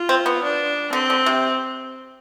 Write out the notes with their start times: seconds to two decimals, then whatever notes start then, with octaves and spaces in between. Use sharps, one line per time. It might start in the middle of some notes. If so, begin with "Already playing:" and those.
Already playing: F4
0.09 C4
0.26 B3
0.43 D4
0.93 D3 C4
1.10 D3
1.26 C3